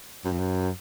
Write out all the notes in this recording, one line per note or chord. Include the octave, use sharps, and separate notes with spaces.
F#2
F2
F#2